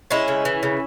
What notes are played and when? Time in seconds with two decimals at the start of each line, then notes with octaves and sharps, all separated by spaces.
0.11 G#3 C#4 E4
0.28 C#3
0.45 E3
0.63 C#3